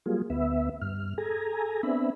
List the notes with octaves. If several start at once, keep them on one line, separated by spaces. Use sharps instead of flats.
F#3 G3 A#3 F4 G#4
D2 B3 E5
G2 F6
G#4 A4 G#5 A#5
B3 C4 D4 E5 B5